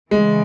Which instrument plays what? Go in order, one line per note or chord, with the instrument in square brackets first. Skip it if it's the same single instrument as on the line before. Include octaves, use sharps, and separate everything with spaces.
[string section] C#3 E3 [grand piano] G#3